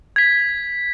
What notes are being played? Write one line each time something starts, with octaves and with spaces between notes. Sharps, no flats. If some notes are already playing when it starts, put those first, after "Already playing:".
G#6 B6